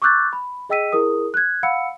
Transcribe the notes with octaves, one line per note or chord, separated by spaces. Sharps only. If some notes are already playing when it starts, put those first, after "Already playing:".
C#6 D6 E6 F#6 G6 A6
B5
G#4 D#5 G5 E6 B6 D#7
E4 G#4 A#4 D#6
F#6 G#6
F5 F#5 B5 E6 C#7